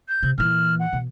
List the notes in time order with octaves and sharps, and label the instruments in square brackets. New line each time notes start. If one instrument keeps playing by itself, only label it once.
[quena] G6
[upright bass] C3
[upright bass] A#2 E3 [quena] F6
[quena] F#5
[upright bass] B2